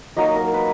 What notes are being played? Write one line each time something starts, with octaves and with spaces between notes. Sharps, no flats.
F#3 A#3 D#4 D#5
A#4
B4